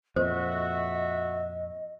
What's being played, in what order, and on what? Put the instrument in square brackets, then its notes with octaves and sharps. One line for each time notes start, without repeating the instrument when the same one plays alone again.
[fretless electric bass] F2 A#2 [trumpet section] F#4 E5 [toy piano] C5 [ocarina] D#5